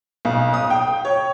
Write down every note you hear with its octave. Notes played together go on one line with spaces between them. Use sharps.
B1
D#6
G5
C#5